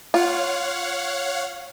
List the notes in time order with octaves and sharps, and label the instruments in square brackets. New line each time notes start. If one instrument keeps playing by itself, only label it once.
[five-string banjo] F4 [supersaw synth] C#5 F5 F#5